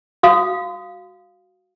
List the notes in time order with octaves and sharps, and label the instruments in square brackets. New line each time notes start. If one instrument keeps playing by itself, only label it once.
[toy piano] F#4 F5 D#6